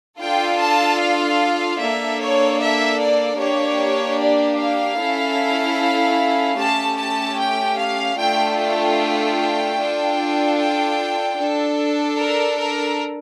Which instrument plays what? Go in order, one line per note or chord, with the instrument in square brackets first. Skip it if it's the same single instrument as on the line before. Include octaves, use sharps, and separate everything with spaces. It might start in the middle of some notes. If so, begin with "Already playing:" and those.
[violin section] D4 F4 A4 G5
A5
F5
A#3 D4 A4 E5
C#5
E5
D5
A#3 D4 G4 C#5
D5
F5
C#4 E4 A4
A3 C#4 G4 A5
A5
G5
F5
A3 D4 F4 A4 G5
G5
D4 F4 A4
G5
D4 A4
A#4
A#4